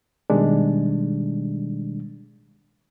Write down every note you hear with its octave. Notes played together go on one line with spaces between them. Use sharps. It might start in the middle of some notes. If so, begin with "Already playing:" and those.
B2 D#3 G3 G#3 D4